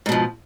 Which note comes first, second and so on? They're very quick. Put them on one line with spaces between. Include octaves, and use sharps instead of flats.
G#2 B2 F3